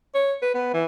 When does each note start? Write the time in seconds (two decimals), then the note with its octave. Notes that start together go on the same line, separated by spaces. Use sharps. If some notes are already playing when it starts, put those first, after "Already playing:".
0.14 C#5
0.42 B4
0.54 B3
0.73 E3